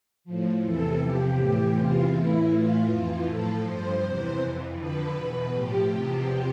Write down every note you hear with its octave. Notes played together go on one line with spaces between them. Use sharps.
A2 F3
E2 C3 E3 A4
E2 C3 F3 G4
A2 E3
E2 C3 E3 F4
A2 E3 E4
A2 E3 F4
F2 E3
A2 F3 A4
G2 F3 C5
E2 C3 E3
F2 E3
F2 D3 F3 B4
E2 B2
A2 F3 G4
E2 C3 F3